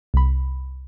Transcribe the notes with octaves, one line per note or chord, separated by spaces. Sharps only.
C2 B5